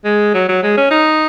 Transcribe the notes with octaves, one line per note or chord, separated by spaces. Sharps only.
G#3
F#3
F#3
G#3
C#4
D#4